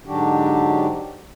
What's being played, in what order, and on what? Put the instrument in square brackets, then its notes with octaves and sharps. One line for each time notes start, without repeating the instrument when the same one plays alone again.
[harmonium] G#2 D3 F#3 D4 F#4 G4